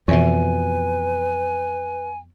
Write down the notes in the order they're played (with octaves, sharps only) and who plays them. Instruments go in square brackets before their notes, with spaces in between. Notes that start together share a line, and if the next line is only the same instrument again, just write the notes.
[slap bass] F2 B2 [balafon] E3 E5 [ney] B4 [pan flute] G#5